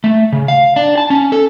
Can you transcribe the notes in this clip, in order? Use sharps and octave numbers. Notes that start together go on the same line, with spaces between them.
A3
C#3
F5
D4
A5
C#4
A4